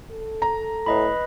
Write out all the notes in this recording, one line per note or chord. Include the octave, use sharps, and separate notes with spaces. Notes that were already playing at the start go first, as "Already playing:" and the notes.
A4
A#5
A2 B4 D#5 B5